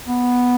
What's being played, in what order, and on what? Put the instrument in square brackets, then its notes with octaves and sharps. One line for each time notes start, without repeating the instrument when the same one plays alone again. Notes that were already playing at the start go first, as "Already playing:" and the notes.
[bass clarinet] B3